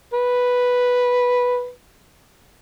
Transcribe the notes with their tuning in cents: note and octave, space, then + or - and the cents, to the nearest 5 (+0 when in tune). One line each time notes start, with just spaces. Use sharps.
B4 -5